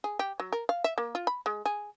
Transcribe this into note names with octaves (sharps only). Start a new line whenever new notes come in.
G#4
G4
F#3
A#4
F5
E5
A#3
F4
B5
G#3
G#4